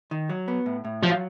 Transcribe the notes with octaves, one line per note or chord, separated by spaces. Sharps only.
D#3
F#3
B3
A2
A2
F3 F#3